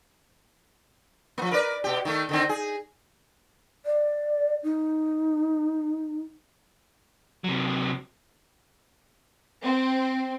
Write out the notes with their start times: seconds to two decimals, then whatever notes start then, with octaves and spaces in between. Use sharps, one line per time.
1.38 F3 A#3
1.51 A#4 B4 D5
1.84 B2 G4
2.05 D#3 A3
2.29 D3 D#3 C4
2.49 G#4
3.86 D5
4.64 D#4
7.44 C3 F#3
9.64 C4